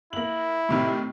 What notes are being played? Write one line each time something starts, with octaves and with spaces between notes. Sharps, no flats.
A#3 E4 F#7
A2 C3 D#3